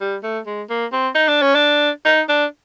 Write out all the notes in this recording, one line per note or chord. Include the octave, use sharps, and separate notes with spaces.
G3
A3
G#3
A#3
C4
D#4
D4
C#4
D4
D#4
D4